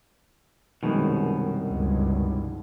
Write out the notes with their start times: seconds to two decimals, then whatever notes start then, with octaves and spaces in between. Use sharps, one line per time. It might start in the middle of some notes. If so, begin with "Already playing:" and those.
0.83 C2 F#2 B2 D#3 G#3
1.68 C#2 G2